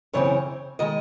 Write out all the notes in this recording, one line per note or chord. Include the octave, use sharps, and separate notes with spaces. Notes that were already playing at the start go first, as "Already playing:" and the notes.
F#2 C#3 E3 C4 C#5
D#3 G#3 D#5